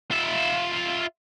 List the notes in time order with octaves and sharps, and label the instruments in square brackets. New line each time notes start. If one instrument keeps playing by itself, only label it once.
[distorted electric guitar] F4 E5